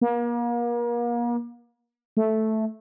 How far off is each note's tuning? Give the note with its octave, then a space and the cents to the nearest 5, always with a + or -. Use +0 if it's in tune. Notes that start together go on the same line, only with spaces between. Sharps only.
A#3 +35
A3 -5